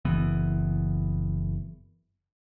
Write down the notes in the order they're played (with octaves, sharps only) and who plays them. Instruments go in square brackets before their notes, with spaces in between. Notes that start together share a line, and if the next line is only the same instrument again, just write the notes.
[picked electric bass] F#1 E3 B3